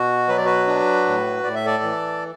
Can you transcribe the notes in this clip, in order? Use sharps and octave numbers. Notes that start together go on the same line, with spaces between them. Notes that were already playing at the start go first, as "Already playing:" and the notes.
Already playing: B2 F#4
F#3 B4
D5
F#4 B4
D4
A2
A2 D5
E5
A4 D5
E3